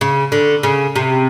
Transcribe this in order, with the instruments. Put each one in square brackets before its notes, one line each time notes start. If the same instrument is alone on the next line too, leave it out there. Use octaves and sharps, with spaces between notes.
[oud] C#3
D3
C#3
C3